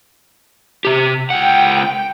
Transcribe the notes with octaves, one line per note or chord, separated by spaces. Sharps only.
C3 G4
C#2 F#5 G5